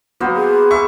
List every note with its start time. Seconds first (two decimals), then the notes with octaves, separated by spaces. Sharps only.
0.20 F#3 A#3 B3 C5
0.36 G#4
0.71 E5 C#6